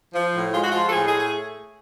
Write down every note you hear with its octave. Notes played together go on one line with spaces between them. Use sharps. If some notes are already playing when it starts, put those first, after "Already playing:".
F3
A2
G#3 F4
F#4
F3 F4
A4
A2 G#4
G#4
A3
G#4